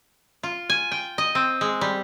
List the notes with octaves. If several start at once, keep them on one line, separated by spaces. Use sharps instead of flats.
F4
G#5
G5
D#5
C4
G#3
G3